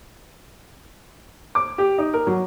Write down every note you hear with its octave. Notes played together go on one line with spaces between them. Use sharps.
D6
G4
D#4
A#4
F#3